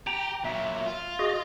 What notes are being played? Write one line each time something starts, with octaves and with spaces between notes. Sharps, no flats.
G4 G5 A#5
A#2 F#3 E5
F4
F#4 G#4 D#5